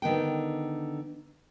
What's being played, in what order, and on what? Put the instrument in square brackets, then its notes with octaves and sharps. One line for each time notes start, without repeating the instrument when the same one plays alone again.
[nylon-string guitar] D3 D#3 B3 G5